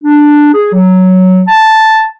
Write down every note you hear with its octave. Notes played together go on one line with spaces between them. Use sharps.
D4
G#4
F#3
A5